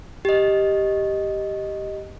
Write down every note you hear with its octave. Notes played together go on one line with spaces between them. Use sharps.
G4 D#5